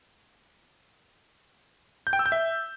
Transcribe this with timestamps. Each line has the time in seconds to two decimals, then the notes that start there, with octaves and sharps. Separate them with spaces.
2.07 G6
2.13 G5
2.19 E6
2.26 G6
2.32 E5